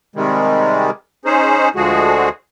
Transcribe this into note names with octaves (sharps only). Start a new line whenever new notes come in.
C3 D#3 G3 G#3
C#4 D#4 G#4 C5
D2 D3 F3 G#3 F#4 G#4